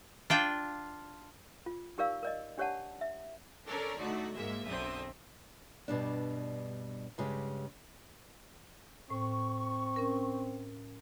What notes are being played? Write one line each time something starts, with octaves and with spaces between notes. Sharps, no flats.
D4 F4 G5
F4
D#4 G4 A#4 D5 F5 E6
A#4 D5 D#5
D4 G4 C#5 D5 F#5 A5
E5
C#4 D4 A4 A#4 C#5 D5
D3 A3 D#4 F#4
G#2 G#3 A#3 E5
B1 F#2 D3 C4 E5 D#6
G2 B2 G3 D4
G2 C#3 G#3 G4
A2 C4 C#6
C#4 A#4